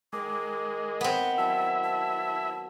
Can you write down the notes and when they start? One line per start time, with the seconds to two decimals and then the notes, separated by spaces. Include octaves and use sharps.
0.13 D#3 G#3 D6
1.01 B3 C4 F#5
1.38 F#3 E4 E5 A5
1.84 A5